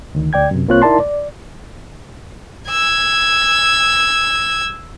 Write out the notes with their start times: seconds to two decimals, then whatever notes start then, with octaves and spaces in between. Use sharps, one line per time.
0.15 D2 D#3
0.33 D2 D5 G5 G#6
0.51 F#2 C3
0.68 C2 A#3 C4 F4 C#5 F#6
0.82 D#4 E4 A#4 D5 A5 C6
1.00 D5
2.70 E6 G#6